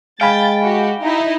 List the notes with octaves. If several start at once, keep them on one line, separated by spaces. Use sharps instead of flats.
G#3 F5 G5 G#5 B5 A6
F#4 G4
D#4 E4 D#5